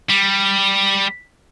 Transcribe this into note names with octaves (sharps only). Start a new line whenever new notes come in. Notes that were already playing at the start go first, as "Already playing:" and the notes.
G3